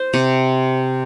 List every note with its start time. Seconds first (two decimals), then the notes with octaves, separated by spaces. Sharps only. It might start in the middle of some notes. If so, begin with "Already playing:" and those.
Already playing: C5
0.14 C3